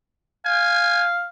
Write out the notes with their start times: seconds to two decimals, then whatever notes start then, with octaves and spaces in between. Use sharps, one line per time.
0.46 F5 G#5